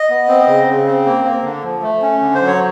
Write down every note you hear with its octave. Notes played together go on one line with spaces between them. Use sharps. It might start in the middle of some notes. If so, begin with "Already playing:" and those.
Already playing: D#5
B3
C4
C#3
C#3
C4
A#3
A#3
D3
F3
A3
C#4
D3
C5
F#3
C#5